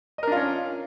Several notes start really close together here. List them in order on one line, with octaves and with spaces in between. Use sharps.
D#5 A#4 D4 F4 C#4